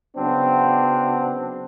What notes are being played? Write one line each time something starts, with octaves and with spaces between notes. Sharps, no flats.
C#3 F#3 B3 C4 D4